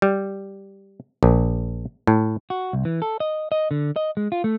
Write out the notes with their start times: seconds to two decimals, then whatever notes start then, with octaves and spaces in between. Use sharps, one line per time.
0.02 G3
1.23 A#1
2.07 A2
2.50 F#4
2.73 C2
2.85 E3
3.02 A4
3.20 D#5
3.52 D#5
3.71 D3
3.96 D#5
4.17 G#3
4.32 F4
4.44 A3